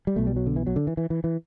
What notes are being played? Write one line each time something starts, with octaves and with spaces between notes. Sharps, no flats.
G3
B1 B2 A3
G3
F#3
D3
E3
F#3
D3
E3
E3
E3
E3